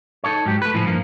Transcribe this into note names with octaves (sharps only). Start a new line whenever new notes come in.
D#4 E4 A4 C#5
G#2 F#3 G4
A3 B4
A2 E3 F3
G2 F3 A#3